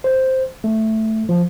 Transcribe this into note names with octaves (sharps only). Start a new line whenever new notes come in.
C5
A3
F3